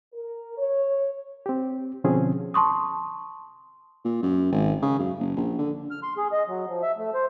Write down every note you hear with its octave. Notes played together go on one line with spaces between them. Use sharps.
A#4
C#5
C4 G4
B2 D3 F3 C4 C#4 G#4
A5 C6 C#6 D#6
A#2
F#2
G#1
C#3
F#2
F#1
A#1
D3
F6
C6
G#4
D#5
F#3
F3
E5
A3
C5